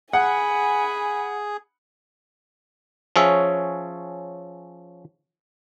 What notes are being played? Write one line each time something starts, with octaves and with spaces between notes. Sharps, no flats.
G#4 F#5 G#5 B5
F3 C#4 G#4 C#5 E5